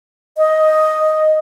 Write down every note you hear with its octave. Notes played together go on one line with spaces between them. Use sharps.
D#5